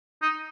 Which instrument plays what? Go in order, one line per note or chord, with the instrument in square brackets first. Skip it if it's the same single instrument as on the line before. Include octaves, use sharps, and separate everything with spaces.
[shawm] D#4